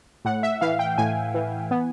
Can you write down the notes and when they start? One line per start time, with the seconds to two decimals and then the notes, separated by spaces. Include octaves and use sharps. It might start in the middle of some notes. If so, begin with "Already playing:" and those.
0.25 A2 F#5
0.43 E5
0.61 E3 F5
0.79 G5
0.98 A2 G#5
1.35 E3
1.71 B3